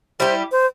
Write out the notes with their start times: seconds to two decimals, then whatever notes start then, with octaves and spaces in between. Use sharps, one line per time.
0.20 G3 E4 G4 C5
0.51 C5